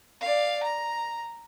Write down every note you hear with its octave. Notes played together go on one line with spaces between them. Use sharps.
D5 F5
A#5